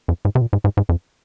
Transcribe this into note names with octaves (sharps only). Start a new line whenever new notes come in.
F2
G#2
C3
A#2
G#2
G#2
G#2
F2